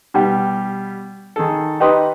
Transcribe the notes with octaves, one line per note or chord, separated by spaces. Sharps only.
B2 G3 G4
D#3 G#4 A4
D#4 G4 B4 C6 D#6